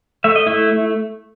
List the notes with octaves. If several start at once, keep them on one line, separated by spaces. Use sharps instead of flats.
A3 E5
D#5
A3 E4 E5
A3